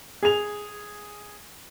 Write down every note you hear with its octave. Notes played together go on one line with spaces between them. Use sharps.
G#4 F7